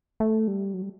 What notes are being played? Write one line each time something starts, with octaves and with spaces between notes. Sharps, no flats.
A3
G3
F#3
G3